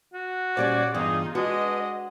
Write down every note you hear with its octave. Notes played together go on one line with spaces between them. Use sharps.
F#4
A#2 G3 C#4 C5 D5 G#6
G2 E3 B3 D#4 F4 G#4
G#3 D4 F#4 B4 D#5